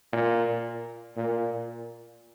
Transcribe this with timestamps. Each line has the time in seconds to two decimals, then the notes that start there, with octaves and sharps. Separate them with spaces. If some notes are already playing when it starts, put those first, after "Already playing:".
0.13 A#2
1.17 A#2